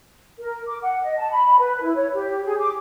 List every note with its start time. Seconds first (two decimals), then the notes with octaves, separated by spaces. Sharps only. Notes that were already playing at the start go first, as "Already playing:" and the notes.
0.39 A#4
0.67 D6
0.82 F#5
1.02 D#5
1.17 A5
1.30 B5
1.58 B4
1.81 E4
1.95 C#5
2.14 G4
2.44 G#4
2.58 D6